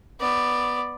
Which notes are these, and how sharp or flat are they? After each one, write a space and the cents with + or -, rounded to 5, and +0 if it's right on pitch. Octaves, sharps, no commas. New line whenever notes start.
B3 +0 D5 +5